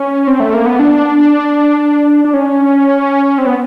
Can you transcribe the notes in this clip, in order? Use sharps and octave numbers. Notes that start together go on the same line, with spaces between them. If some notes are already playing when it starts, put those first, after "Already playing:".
Already playing: C#4
C4
A3
A#3
B3
D4
D4
C#4
C4
B3